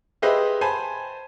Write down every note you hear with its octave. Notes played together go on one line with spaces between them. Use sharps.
G4 G#4 B4 C5 D#5 E5
C5 G#5 A5 B5